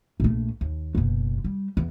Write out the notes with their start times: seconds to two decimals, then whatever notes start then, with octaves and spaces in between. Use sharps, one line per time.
0.20 A#1 A3
0.61 D#2
0.95 F#1 B2
1.44 G3
1.77 E2